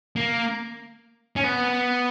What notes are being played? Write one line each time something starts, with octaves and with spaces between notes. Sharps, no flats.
A#3
C#4
B3